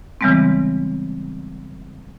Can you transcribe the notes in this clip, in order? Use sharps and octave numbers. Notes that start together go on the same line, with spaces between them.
C#3 E3 G3 G#3 B3 C4